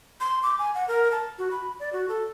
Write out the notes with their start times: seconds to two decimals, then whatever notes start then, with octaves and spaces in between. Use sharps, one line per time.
0.20 C6
0.43 D6
0.59 G#5
0.74 F#5
0.88 A#4
1.12 A5
1.39 F#4
1.51 B5
1.80 D5
1.93 F#4
2.09 A4